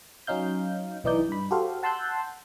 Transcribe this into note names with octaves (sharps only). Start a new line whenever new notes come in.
F#3 C#4 D#4 F5 G6
B1 E3 D#4 D5 G6
G2 B5
F#4 G4 A4 C5 F5
F#5 A5 C6 E6 F#6 G6